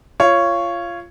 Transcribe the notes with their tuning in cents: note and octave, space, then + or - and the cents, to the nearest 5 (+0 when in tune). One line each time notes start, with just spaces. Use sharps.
F4 -20 C#5 +0